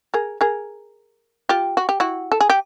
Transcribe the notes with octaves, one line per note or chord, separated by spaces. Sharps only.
G#4 A#4
G#4 A#4
F4 G4
F#4
G4
E4 F#4
A4
G#4
G4